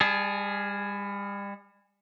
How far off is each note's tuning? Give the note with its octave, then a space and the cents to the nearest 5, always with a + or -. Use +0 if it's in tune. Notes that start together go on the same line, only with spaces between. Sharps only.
G3 +35 G#4 +0 A5 -25